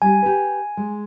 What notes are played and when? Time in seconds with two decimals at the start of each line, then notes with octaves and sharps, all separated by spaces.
0.02 G3 G4 G#5
0.23 G4 B4
0.77 G#3